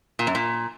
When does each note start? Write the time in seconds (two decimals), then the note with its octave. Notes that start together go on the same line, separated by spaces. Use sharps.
0.19 A#2
0.27 F#2
0.35 A#2